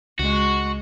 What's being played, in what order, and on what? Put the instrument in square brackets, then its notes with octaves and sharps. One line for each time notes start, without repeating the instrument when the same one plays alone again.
[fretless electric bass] C#2 [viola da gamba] G#3 [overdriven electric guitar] F#4